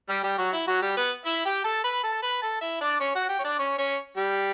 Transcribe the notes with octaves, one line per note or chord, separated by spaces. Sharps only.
G3 G4
G3 G4
F#3 F#4
E4
F#3 F#4
G3 G4
B3 B4
E4 E5
G4 G5
A4 A5
B4 B5
A4 A5
B4 B5
A4 A5
E4 E5
D4 D5
C#4 C#5
F#4 F#5
G4 G5
C#5
D4 D5
C#4 C#5
C#4 C#5
G3 G4